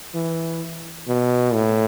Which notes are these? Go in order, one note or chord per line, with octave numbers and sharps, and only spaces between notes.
E3
B2
A2